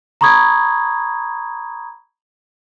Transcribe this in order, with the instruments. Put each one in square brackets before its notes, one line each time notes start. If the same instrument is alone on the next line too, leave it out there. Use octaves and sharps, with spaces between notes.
[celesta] A#5 B5 C#6 D#6 G#6